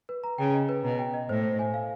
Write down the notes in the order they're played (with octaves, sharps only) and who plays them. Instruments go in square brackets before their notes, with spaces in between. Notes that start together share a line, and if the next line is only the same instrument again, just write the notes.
[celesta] B4
A#5
[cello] C#3 [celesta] G5
[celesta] D#5
B4
[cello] B2 [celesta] A#5
[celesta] G5
D#5
[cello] A2 [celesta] C5
[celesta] C5
G#5
F5